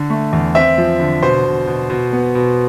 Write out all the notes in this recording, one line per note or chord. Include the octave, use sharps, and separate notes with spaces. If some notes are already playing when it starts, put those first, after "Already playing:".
Already playing: D3
A3
E2
C4 E5
F3
D3
B2 C5
B2
B2
B2
B3
B2